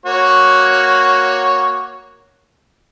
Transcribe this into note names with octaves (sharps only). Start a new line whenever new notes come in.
A#3 F#4 C#5